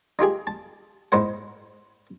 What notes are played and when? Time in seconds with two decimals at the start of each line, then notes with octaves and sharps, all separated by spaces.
0.19 D#4 F4 G4 G#4
0.47 A5
1.12 G#2 D#4 E4 C5 F#5